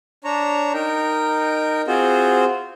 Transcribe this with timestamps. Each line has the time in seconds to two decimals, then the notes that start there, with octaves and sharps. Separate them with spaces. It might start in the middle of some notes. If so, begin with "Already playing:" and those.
0.24 D4 C#5 A#5
0.74 D#4 A#4 G5
1.87 C4 F4 F#4 G#4 C5